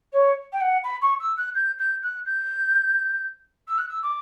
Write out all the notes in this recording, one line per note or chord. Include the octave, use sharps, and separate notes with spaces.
C#5
G5
F#5
B5
C#6
E6
F#6
G6
G6
F#6
G6
E6
F#6
E6
D6